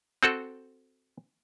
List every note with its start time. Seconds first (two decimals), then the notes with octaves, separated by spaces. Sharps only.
0.23 C4 F#4 A4